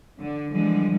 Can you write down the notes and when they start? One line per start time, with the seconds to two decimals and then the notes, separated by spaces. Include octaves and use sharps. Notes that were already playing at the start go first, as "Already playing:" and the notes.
0.20 D3
0.52 D3 E3 F3 G3 G#3